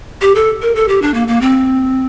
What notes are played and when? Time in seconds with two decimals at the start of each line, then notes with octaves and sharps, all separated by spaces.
0.21 G4
0.35 A4
0.62 A#4
0.75 A4
0.88 G4
1.02 D4
1.14 A#3
1.28 A#3
1.41 C4